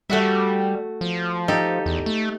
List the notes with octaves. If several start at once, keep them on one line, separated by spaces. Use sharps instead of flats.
G3 A3 F#4 E5
F3
D#4 G4 A4
E2
A3